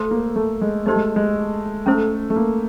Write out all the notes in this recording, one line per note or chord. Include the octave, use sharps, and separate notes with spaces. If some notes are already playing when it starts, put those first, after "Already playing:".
Already playing: A3 F#4 A4 C5
A#3
A3
G#3
A3 D#4 G4 C5 D#5
G#3
G#3
A3 C#4 E4 A4 C5
A3
A#3